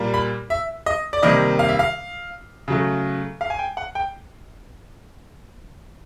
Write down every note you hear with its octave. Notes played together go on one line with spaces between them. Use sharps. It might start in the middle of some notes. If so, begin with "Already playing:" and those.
Already playing: A#2 G3 A#3
B5
E5
D#5
D5
C3 D#3 G3 A#3 D#5
F5
E5
F5
C#3 F#3 A3
F5
G#5
G5
F#5
G5